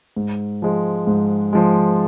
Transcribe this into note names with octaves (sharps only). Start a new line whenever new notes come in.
G#2
F3 G#3
G#2
F3 G#3